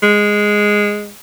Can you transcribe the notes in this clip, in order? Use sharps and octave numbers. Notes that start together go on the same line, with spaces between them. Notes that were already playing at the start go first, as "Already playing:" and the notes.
G#3